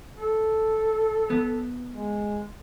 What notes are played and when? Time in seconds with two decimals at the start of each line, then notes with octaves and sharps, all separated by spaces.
0.17 A4
1.30 B3
1.92 G#3